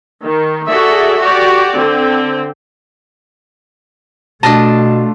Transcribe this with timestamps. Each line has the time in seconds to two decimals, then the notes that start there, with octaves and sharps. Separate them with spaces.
0.24 D#3
0.66 F#4 G#4 A4 D5 E5
1.19 F#4 G4 D5
1.77 D3 C4
4.43 B2 A3 D4 F4 D#5 A5